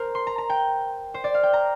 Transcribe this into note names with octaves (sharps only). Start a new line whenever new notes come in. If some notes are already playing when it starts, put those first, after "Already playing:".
Already playing: A#4 C5
C6
A#5
A#5
G5
C5
D5
F5
G5
A#5